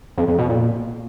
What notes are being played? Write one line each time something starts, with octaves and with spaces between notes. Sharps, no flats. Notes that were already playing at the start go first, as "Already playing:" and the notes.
F2
F2
B2
A#2